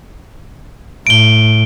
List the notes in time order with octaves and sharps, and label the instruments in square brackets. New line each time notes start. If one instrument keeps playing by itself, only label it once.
[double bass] A2 [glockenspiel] D7 G7